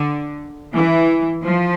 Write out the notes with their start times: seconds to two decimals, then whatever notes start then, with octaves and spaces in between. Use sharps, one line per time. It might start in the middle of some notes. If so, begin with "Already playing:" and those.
Already playing: D3
0.74 E3
1.44 F3